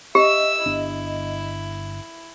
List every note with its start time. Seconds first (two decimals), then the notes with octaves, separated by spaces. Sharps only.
0.15 G4 D#5 E5 E6
0.66 G1 B3 D4 E4